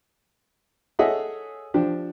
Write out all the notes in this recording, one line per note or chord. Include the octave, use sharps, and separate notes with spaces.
G#4 A4 C#5 D#5 E5 F#5
F3 D4 G4